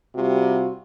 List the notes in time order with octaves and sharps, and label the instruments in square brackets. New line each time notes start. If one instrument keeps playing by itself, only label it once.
[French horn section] C3 G3 F4 F#4